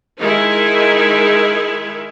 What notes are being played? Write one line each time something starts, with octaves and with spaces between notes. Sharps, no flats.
D#3 G#3 D#4 E4